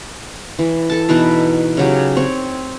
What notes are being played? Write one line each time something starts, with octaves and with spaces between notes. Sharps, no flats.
E3
A4 A5
B2 E3 D#4 B4
C#3 F#3 G4
C4 C#5